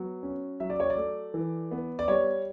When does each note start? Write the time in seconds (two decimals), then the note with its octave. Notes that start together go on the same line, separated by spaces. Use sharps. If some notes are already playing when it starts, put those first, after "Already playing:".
Already playing: F#3 B3
0.23 C#4
0.60 F#3 E5
0.70 D5
0.80 C#5
0.90 D5
0.97 A3
1.34 E3
1.71 B3
1.99 D5
2.08 G3 C#5